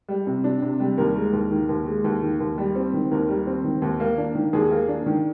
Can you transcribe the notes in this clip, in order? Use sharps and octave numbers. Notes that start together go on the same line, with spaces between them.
G3
C3
D4
C3
G3
D#2 A#4
G#3
D#2
D#3
D#2
G#3
D#2
D#3
D#2
G3
C4
D#3
D#2 A#4
G3
C4
D#3
D#2
A#3
D4
D#3
D#2 G#4
A#3
D4
D#3